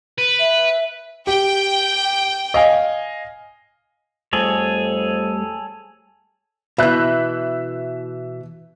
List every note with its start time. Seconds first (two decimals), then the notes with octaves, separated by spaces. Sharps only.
0.18 B4
0.39 E5
1.27 G4 G5
2.54 D#5 F5 G#5
4.33 F2 G3 A3 G#4 A4 C#5
6.78 B2 E3 E5 F#6 G6